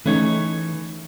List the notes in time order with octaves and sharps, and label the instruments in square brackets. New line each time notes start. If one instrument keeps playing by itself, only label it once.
[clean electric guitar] E3 C#5 [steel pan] A3 C#4 D#4